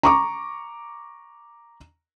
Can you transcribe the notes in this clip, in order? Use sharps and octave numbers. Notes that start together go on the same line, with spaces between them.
A#5 C#6 D6